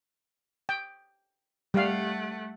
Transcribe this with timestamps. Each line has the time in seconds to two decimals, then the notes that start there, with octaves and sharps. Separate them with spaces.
0.69 G5
1.74 G3 A3 F5 F#5